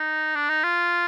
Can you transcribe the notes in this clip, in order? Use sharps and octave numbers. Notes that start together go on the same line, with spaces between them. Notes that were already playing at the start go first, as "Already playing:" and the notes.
Already playing: D#4
D4
D#4
F4